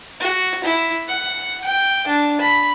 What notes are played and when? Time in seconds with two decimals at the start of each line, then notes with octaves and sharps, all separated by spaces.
0.20 F#4
0.64 E4
1.08 F#5
1.64 G5
2.07 D4
2.41 B5